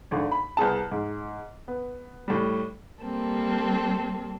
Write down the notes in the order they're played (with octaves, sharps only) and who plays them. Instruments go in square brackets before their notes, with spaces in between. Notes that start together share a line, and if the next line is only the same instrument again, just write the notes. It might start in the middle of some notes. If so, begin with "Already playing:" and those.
[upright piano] G#1 D3
B5
C2 B3 G#4 A5
G#2
B3
A2 G3
[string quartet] G3 A#3 C4 A4